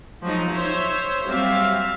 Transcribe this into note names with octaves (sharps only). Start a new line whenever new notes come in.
F3 F#3 G#3 D#4
C5 C#5 E5
F#3 G3 C4 E5 F5